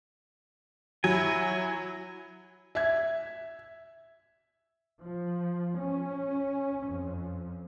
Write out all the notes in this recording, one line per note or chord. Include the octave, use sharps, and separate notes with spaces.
F#3 E4 G#5
E5 G#6
F3
C#4
F2